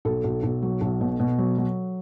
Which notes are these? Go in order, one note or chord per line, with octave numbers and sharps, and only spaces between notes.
B1 A4
B1
B1
F#3
B1
B2
B2
F#3
F#3